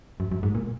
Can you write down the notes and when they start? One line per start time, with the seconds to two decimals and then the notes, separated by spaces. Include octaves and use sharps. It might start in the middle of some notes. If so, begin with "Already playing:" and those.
0.20 F#2
0.32 F#2
0.43 G#2
0.55 A#2